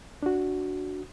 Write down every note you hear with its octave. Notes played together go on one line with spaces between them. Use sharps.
D4 F#4